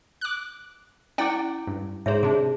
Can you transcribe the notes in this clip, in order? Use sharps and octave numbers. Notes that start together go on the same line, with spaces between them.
D6 F#6
C#4 E4 D5 F#5 G5 D6
G2
G#2 G#4 C5 C#5 E5
C3 D4 G#4